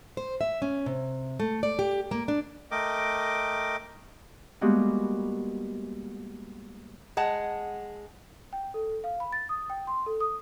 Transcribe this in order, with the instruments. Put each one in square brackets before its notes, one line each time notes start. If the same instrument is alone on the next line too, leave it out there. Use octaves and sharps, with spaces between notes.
[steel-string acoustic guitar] C5
E5
C#4
C3
A3
D5
G4
A#3
D4
[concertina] A3 A#4 D#5 G5 D6
[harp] G3 G#3 A#3 B3 F#4 G4
[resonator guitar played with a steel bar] G#3 F#5 A5
[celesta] G5
A4
F5
B5
A6
D#6
G5
C6
A4
D#6